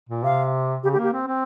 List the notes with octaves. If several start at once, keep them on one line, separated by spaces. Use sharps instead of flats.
A#2
C3 F5
C#3 G4
G4
A#3
G4
C4
C4